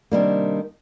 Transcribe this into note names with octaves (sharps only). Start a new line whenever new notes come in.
C3 D#3 G3 A#3 D4